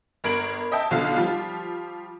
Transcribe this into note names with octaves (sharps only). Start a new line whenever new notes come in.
G1 A#4 B5 G#6 D7 F#7
D#5 E5 G5 A5
B1 D3 F3 F5
F3 G3 F4